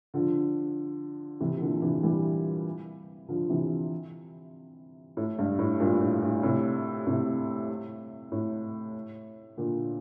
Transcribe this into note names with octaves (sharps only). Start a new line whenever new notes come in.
D3 F3
C3 E3
E3
A#2 D3
C3 E3
E3 G3
D3 F3
C3 E3
A2
G2
A2
G2 A#2
A2
A2
A2 C3
A2 C3
A2
A#2 D3